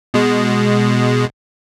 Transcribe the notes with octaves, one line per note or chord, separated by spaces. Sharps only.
B2 G#3